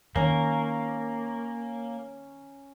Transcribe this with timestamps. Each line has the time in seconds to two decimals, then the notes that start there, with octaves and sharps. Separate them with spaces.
0.16 D#3 A#3 C#4 A#5